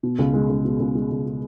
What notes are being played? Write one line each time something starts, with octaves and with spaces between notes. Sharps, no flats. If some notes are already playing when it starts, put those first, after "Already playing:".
B2
C#2
G#3
C#2
B2
C#2
G#3
C#2
B2